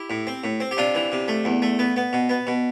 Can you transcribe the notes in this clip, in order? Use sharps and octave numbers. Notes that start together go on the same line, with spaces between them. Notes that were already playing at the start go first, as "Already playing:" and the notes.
Already playing: E4 G4
A2
C4
A2
C4
G4
C3 D4 F4
E3
C3
A3
E2
A3
B3
B3
B2
B3
B2